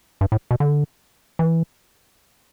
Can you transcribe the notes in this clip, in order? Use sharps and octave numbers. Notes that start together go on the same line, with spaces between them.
G2
A2
B2
D3
E3